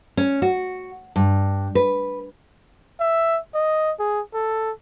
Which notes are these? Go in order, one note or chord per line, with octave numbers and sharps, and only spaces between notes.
C#4
F#4
G2
B4
E5
D#5
G#4
A4